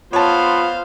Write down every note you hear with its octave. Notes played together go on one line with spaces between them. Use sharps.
B3 F4 C5 C#5 F5 A5